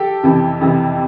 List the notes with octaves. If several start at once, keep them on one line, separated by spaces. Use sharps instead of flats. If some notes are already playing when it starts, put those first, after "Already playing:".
Already playing: G4 A4
F2 C3 E3
F2 C3 E3